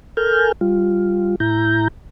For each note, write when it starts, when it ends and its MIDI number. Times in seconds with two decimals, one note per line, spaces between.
0.17 0.52 69
0.17 0.52 70
0.17 0.52 80
0.17 0.52 89
0.17 0.52 91
0.61 1.35 55
0.61 1.35 65
1.40 1.88 45
1.40 1.88 64
1.40 1.88 82
1.40 1.88 91